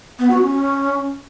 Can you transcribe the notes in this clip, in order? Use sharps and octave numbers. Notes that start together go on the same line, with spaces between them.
B3
F#4
C#4